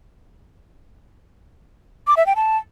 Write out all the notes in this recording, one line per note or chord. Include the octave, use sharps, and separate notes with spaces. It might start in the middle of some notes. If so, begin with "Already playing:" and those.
D6
E5
G5
A5